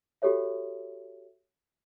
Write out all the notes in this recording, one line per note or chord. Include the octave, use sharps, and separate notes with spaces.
F#4 G4 A4 C#5 E5